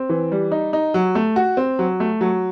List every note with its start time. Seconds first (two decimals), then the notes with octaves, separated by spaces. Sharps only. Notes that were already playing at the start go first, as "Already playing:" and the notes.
Already playing: C4
0.09 E3
0.32 G3
0.52 D#4
0.73 D#4
0.94 F#3
1.15 A3
1.36 F#4
1.57 C4
1.79 F#3
2.00 A3
2.21 F#3